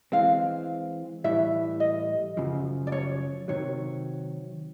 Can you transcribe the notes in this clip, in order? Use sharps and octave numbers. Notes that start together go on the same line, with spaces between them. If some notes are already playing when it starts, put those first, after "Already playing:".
E3 G#3 C4 F5
A2 E3 G3 E5
D#5
F#2 C#3 F3
D5
C#5
C3 D#3 F#3 C#5